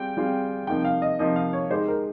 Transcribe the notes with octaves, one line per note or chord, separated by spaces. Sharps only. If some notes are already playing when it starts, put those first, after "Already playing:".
Already playing: G3 C4 F4 G#4 G5
G3 C4 F4 G#4
C3 F3 A#3 D#4 G5
F5
D#5
C3 F3 A#3 D#4 D#5
F5
C#5
G#3 D#4 G4 C5
A#4